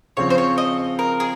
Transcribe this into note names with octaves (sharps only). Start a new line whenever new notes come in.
C#3 F3 C4 C#5
C5
C#5
D#5
A#4
G#4